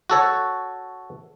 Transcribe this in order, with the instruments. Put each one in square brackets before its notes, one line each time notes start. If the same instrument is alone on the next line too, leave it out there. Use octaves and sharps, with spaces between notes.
[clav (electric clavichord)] F#4 A4 C#5